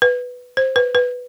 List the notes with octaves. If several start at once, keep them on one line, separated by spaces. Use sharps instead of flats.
B4
C5
B4
B4